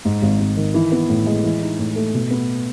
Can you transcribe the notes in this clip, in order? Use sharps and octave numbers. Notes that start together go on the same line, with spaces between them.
G#2
G#1
G#1
D#3
E3
B3
A2
G#3
E3
D#4
A2
A3
B2
B3